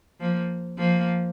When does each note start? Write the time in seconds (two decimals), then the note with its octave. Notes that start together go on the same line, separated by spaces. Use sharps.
0.20 F3 A#3
0.78 F3 A#3